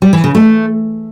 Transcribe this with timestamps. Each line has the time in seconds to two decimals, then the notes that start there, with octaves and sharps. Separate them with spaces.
0.02 G3
0.13 E3
0.24 C#3
0.35 A3